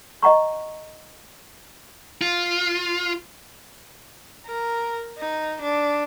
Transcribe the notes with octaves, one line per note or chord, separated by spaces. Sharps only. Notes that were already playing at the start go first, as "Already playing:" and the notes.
D#5 F#5 A#5 C#6
F4
A#4
D#4
D4